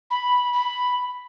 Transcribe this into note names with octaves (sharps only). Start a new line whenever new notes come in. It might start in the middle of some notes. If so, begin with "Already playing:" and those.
B5
B5